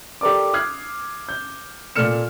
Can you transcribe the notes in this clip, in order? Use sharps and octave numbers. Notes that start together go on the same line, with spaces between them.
G4 A4 A#4 D5 D6
D#6 F6 F#6 G#6 C7
G6
A#2 A4 D5 F6 C#7 E7